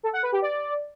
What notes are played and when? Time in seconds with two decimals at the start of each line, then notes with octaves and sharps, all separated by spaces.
0.03 A4
0.13 F#5
0.23 B4
0.32 G4
0.42 D5